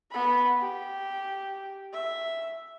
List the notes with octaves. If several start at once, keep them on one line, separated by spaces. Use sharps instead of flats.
B3 B5
G4
E5